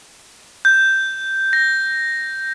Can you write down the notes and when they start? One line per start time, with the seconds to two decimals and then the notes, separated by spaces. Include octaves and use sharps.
0.65 G6
1.53 A#6